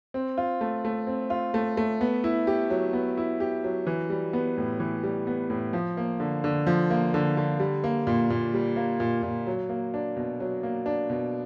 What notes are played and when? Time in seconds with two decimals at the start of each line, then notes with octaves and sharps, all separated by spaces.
0.14 C4
0.38 F4
0.61 A3
0.85 A3
1.07 C4
1.30 F4
1.54 A3
1.77 A3
2.01 B3
2.24 E4
2.47 G4
2.70 F#3
2.93 B3
3.17 E4
3.40 G4
3.64 F#3
3.87 E3
4.10 G3
4.33 B3
4.58 A2
4.80 E3
5.03 G3
5.27 B3
5.50 A2
5.73 F3
5.97 A#3
6.20 D3
6.44 D3
6.67 F3
6.90 A#3
7.14 D3
7.37 D3
7.60 G3
7.84 A#3
8.07 A#2
8.30 A#2
8.54 G3
8.76 A#3
9.00 A#2
9.23 A#2
9.47 F#3
9.69 A#3
9.94 D4
10.16 B2
10.40 F#3
10.63 A#3
10.86 D4
11.10 B2